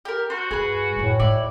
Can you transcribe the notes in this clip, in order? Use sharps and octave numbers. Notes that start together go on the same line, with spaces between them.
G4 A#4
F#4 C5
G2 G#4 B4
F#2 A2 D#3
G#2 E4 D5